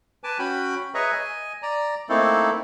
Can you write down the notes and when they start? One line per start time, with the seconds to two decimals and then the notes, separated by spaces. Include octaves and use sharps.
0.24 B4 G#5 A5 D6
0.39 C#4 F#4 G5 B5
0.94 G#4 B4 C#5 D#5 E5 A#5
1.13 D#5 G#5
1.62 D5 A#5
2.09 A3 A#3 C4 D#4 E4 A4